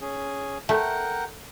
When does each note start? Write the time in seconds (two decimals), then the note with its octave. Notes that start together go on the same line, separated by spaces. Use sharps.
0.01 C#4 G#4
0.69 A3 A#4 F#5 G5